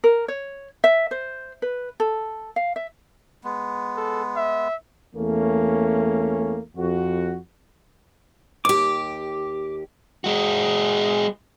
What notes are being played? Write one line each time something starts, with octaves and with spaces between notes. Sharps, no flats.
A#4
C#5
E5
C5
B4
A4
F5
E5
G#3 B3
A4
E5
E2 A3 A#3 C#4
F2 F#4
D#2 G4 D6
G#3 F#4